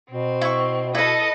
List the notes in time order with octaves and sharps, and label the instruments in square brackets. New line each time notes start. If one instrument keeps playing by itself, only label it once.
[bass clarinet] B2 [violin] C4
[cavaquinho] E4 C#6
[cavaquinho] E4 B4 [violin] A4 D#5